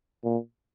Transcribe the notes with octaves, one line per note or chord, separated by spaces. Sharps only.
A#2